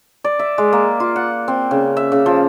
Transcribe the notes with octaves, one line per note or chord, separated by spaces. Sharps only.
D5
E5
G#3
A#3
F4
F#5
C4
C#3
E5
C#3
F3